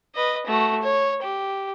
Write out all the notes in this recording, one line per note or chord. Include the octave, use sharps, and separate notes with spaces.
B4 D#5
A3 F#4
C#5
G4